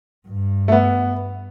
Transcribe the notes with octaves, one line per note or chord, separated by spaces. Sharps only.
G2
A3
B3